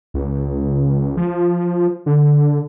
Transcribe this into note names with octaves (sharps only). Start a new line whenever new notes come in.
C#2
F3
D3